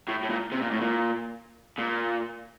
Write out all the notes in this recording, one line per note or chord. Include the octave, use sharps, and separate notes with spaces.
A2
A2
A#2
C3
A#2
A2
A#2
A#2